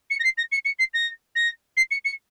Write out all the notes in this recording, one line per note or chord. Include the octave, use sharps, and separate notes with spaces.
C#7
A#6
C7
A#6
C#7
C#7
C7
A#6
A#6
C7
C#7
C#7